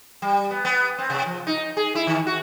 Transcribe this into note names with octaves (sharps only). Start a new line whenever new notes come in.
G3
B3
B3
C4
C3
F3
D#4
G#4
E4
D#3
F#4